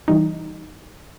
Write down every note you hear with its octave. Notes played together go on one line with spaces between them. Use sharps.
E3 G3 D#4